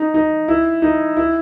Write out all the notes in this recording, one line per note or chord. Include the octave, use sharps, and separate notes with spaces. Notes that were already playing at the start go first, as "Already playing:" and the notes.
Already playing: D#4
D#4
E4
D#4
E4